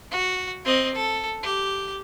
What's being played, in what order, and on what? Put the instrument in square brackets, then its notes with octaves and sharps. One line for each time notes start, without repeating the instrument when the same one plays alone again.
[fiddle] F#4
C4 D#5
A4
G4